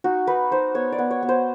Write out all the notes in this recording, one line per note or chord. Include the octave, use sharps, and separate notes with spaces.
D#4 F#4
D#4 B4
D#4 C5
B3 C#5
D5
B3
C#5
B3
C5